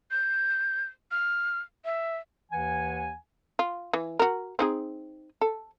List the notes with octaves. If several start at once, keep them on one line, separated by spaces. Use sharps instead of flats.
G6
F6
E5
D#2 E3 F#5 G#5
F4
E3
F#4 A#4
C4 D#4 G#4
A4